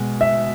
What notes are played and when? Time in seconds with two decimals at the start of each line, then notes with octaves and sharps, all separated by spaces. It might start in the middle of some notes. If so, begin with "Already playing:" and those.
Already playing: B2 G#3
0.21 E5